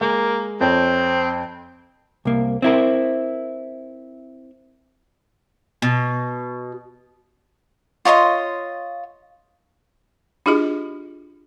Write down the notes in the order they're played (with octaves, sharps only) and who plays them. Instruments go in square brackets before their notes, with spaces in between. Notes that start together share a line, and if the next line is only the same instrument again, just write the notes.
[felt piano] G#3 [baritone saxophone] A#3
[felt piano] F2 C#5 G5 [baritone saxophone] C4
[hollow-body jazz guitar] C2 A#3
C4 E4 A#4
[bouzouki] B2
[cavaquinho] F4 C#5 D#5 C6
[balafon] D4 E4 F4 G4 G#4 D#5